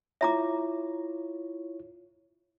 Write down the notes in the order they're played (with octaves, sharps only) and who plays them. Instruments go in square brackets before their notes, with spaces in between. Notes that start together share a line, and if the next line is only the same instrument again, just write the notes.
[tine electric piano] E4 F4 C#5 [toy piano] E5 A#5 D6